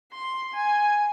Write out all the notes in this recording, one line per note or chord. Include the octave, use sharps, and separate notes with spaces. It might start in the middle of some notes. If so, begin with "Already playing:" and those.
C6
G#5